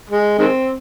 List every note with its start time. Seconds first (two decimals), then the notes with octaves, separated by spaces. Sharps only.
0.10 G#3
0.39 D#3 G#3 C4